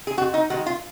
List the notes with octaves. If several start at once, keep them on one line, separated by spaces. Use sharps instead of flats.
G#4
F2 F#4
D#4
D#3 G#3 F#4
F4